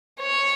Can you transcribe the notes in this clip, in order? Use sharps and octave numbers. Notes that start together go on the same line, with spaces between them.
C#5